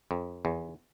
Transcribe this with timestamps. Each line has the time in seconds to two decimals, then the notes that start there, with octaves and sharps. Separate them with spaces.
0.11 F2
0.45 E2